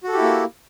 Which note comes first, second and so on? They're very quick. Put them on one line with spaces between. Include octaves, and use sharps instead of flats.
F#4 A4 G4 E4 A#3